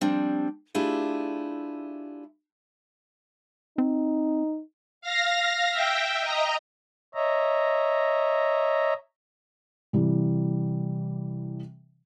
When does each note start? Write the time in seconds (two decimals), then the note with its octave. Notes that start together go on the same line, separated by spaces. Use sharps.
0.01 F3 G3 C4 D4
0.75 A3 D4 E4 F4 G4 G#4
3.78 C4 D#4
5.01 F5 A#6
5.70 E5 G5
6.20 D#5 A#5
7.15 C#5 D#5 E5 A#5
9.93 C3 E3 G3